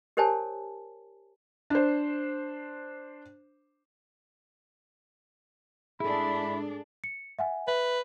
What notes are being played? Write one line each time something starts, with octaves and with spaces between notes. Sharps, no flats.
G4 A#4 C5 C#5 G#5 A5
D4 C5
G#2 D4 E4 G#4 A4 B5
C#7
E5 F#5 G#5
B4 E5